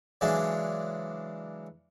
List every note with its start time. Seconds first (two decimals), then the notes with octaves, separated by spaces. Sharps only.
0.21 C#3 E3 F#3 G#3 D4